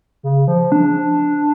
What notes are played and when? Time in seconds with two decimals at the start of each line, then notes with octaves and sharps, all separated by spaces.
0.23 C#3
0.48 F3
0.72 D4